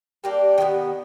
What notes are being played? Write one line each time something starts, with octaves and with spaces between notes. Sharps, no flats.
G3 A#3 D4 G4
D#3 G#3 B3